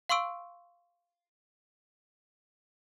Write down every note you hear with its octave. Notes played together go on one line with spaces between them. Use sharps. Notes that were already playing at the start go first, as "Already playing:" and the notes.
F5 C6 C#6 E6 D7